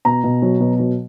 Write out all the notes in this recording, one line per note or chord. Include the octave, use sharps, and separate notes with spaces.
B2 A#5
B2
F#3
B2
F#3